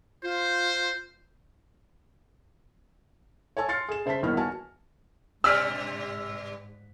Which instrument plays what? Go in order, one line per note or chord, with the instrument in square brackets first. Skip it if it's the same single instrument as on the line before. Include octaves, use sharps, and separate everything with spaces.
[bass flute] F4 [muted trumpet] C5
[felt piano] C#5 G#5 A5 E6
C6 F6 A6 C7 C#7
G#4 E7
C#3 C5 E5 A5 B6
G1 E2 D#3 A#3 B3 F6
F#4 G#5 A5 F6
[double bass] G#2 [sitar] B2 G3 D5 [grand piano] E6 F6 B6